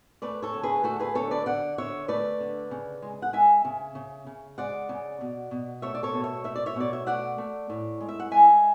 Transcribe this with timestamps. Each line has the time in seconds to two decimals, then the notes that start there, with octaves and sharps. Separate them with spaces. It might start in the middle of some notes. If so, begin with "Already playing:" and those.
0.22 A3 B4 D5
0.42 A4 C#5
0.54 D3
0.63 G#4 B4
0.84 A3 F#4 A4
1.00 G#4 B4
1.15 D3 A4 C#5
1.31 B4 D5
1.46 D3 D5 F#5
1.78 D3 C#5 E5
2.08 A3 B4 D5
2.41 D3
2.71 C#3
3.02 G#3
3.22 F#5
3.33 G#3 E5 G#5
3.65 C#3
3.95 C#3
4.27 C#3
4.58 G#3 D5 F#5
4.89 C#3
5.21 B2
5.51 B2
5.82 A3 C#5 E5
5.95 D5
6.03 A4 C#5
6.13 B2
6.24 C#5 E5
6.44 A3 E5
6.56 D5
6.66 C#5 E5
6.76 B2 D5
6.93 E5
7.06 A3 D5 F#5
7.38 A3
7.70 A2
8.01 G#3
8.09 E5
8.20 F#5
8.31 G#3 E5 G#5